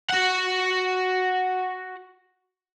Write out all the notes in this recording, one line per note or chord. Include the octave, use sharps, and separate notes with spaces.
F#4 F#5